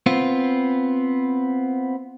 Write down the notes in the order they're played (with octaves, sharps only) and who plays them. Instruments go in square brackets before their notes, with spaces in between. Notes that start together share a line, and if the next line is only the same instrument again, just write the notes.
[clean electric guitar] B3 C4 F4